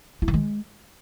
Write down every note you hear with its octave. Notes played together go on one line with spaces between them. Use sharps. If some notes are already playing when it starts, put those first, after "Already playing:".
E4
D#3
G#3